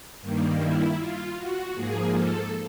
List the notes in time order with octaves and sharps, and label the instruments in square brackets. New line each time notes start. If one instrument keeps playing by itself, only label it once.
[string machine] G2 D#3 G3 A#3
E4
F4
F#4
G#2 F3 A#3 G#4
A4